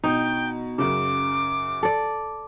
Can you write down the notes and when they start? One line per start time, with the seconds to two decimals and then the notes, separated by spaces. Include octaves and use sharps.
0.04 B2 D#4 G5
0.78 F#2 C#3 D6
1.83 A4 D5